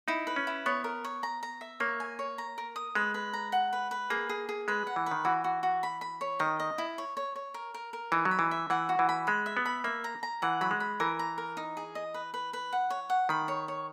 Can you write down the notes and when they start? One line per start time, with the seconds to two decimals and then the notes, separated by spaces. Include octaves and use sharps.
0.08 D#4 E4
0.27 B4
0.36 C#4
0.47 E4
0.66 B3 C#5
0.84 A#4
1.04 C#5
1.23 A#5
1.43 A#5
1.61 E5
1.80 A#3 C#5
2.00 G#5
2.19 C#5
2.38 A#5
2.58 A#4
2.76 D#6
2.95 G#3 B4
3.14 B4
3.34 A#5
3.52 F#5
3.73 B4
3.91 B4
4.10 A#3 G#4
4.29 G#4
4.49 G#4
4.68 G#3 B4
4.87 F#5
4.96 E3
5.06 B4
5.11 D#3
5.25 E3 F#4
5.44 F#4
5.63 F#4
5.83 B5
6.01 B5
6.21 C#5
6.39 D#3 D#5
6.60 D#5
6.78 E4
6.98 C#5
7.17 C#5
7.36 C#5
7.54 A#4
7.74 A#4
7.93 A#4
8.12 E3 D#4
8.25 F#3
8.31 B5
8.39 E3
8.51 E5
8.70 E3 F#5
8.89 F#4
8.99 E3
9.09 B5
9.27 G#3 B5
9.46 E5
9.57 B3
9.65 B5
9.84 A#3 E5
10.04 A#5
10.23 A#5
10.42 E3 F#5
10.61 F#3 B5
10.71 G#3
10.80 B5
11.00 E3 A#4
11.19 A#5
11.38 A#4
11.57 D#4
11.77 G#4
11.95 D#5
12.14 B4
12.34 B4
12.53 B4
12.73 F#5
12.90 C#5
13.10 F#5
13.29 D#3 B5
13.48 C#5
13.68 C#5